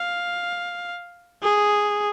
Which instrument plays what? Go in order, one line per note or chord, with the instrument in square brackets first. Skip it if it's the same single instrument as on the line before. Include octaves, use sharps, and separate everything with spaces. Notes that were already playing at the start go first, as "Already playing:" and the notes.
Already playing: [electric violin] F5
G#4